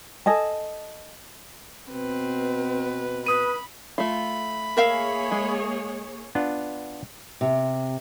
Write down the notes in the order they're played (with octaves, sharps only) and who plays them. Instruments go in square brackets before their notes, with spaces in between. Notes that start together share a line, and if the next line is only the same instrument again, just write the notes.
[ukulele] A4 D#5 G#5 A5
[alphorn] B2 [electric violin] C4 B4
[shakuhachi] B4 [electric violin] B5 [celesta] D#6 D#7
[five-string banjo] A3 F4 [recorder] B5
[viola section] A#3 G#4 C#5 [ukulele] A#4 E5 F5
[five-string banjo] G#3
[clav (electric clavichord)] B3 D4 F4
[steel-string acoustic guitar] C3